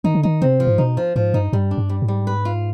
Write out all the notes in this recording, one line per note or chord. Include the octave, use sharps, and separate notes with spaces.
D#3 D#4
D3
D#3 D#4
C3 C4
F3
G#2
B2 D#4
F3
G#2 F3
G2 D#4
G2 G3
D4
G2
G3
G#2
G3
B4
F4